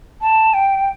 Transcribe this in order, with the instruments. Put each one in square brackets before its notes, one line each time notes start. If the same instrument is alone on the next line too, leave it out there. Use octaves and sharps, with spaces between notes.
[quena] A5
G5